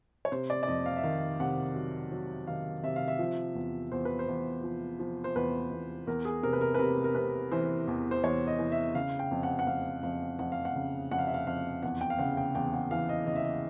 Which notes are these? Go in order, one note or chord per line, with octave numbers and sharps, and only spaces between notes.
C#5
C3 C5
D5
D5
F2 D#5
F5
E5
D#3 F5
C3 F#5
F#3
F#3
D#3 F5
C3 E5
F5
E5
F3
E2
E2 C5
B4
C5
E2
F3
F3
C5
E2 B4
E2
E2 A#4
G#4
C3 A#4
B4
A#4
B4
C3 A#4
A#4
C3 B4
E3 C5
E2
C5
E2 C#5
D#5
E3
E5
C#3 F5
G5
F2
F#5
F#5
F2 F5
F2 F5
F2 F#5
F5
F#5
C#3
F2 F#5
F5
E5
F5
F2 F5
E2 F#5
G5
F5
C#3 F#5
G5
E2 G5
F#5
E3 F5
D#5
C#3 D#5
E5
D#5